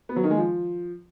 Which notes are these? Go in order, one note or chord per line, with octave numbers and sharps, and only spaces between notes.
B3
F#3
D#3
G#3
F3